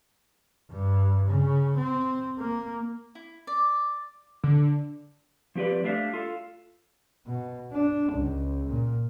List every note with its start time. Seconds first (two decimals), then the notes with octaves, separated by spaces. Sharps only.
0.71 G2
1.29 C#3
1.77 C4
2.39 A#3
3.15 E4
3.47 D5
4.44 D3
5.55 F3 C4 G4 B4 D5
5.84 A3 D4 G4 C5 E5 F5
6.13 F4 A4 F5
7.27 B2
7.72 D4
8.12 C#2
8.68 A#2